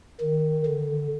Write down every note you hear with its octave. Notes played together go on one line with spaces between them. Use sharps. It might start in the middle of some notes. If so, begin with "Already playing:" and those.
D#3
D3